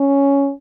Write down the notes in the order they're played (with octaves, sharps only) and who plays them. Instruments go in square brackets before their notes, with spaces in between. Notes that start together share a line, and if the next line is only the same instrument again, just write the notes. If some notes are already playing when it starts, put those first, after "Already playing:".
Already playing: [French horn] C#4